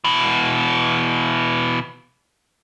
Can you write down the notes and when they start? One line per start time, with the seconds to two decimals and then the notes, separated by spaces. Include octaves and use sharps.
0.04 B2 E3